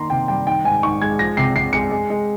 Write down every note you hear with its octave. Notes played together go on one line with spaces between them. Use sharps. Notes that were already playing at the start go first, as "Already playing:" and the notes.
Already playing: D#3 A#3 A#5 C6
C3 G5
G3 G5
D#3 G5
G#2 G#5
G#2 C#6
G#3 G#6
F3 A#6
C3 C7
C3 C7
G#3 C#7
G#3
G#3